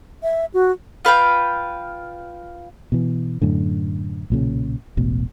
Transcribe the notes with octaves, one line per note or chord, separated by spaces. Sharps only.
E5
F#4
F4 B4 F5 G5
B2 E3
F#2 A2 D3
B1 A#2 C#3
E1 A1 B2